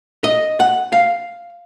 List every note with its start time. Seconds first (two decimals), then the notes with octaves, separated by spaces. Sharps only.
0.24 D#5
0.60 F#5
0.92 F5